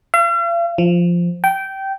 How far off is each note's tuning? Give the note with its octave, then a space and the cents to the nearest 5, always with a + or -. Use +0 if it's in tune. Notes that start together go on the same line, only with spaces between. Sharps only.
F5 -45
F3 -5
G5 -15